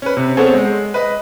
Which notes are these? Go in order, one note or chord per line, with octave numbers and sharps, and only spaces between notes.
C#4 B4
C3
B3 C4 G#4 A4 C5 C#5
G#3
B4 D#5